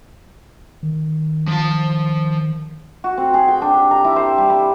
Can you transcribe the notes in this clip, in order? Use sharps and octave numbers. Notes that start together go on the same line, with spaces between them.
D#3
F3 A5
F#4
C4
G#4
G5
D4
G4
A#5
E4
C5
G3
B5